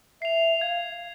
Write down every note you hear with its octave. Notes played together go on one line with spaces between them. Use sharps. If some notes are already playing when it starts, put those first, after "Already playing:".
E5 C7 F7
F5 G#6